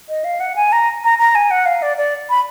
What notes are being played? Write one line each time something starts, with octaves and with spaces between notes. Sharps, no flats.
D#5
F5
F#5
G#5
A#5
A#5
A#5
G#5
F#5
F5
D5
D5
B5